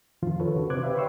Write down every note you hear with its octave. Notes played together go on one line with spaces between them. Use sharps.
F2 A2 D3 D#3 F3 F4
D#3 A4 B4 C#5
C#2 C#3 D4 F#4
C3 B4 C5 D6 F#6 G#6
G4 B4 C5 D5 E5 F5
B4 C#5 G5 C6 C#6 E6